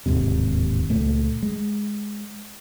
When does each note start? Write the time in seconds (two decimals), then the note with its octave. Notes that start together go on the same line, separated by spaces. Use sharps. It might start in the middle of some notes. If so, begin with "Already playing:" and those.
0.06 D1 D#2 G#2 C3
0.90 C#2 A#2 A3
1.43 G#3